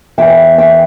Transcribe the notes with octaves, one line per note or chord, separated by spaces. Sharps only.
E2 E3 E5 G5
E5 G5